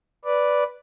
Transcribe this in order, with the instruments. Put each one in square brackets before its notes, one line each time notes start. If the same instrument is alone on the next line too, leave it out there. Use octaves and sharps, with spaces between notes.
[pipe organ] B4 D5